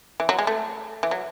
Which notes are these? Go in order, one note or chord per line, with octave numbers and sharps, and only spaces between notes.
E3
F#3
G#3
A3
E3
F#3